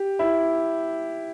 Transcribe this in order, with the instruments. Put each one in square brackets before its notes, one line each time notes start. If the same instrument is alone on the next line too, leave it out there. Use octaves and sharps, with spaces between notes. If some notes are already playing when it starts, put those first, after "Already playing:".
Already playing: [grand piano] G4
E4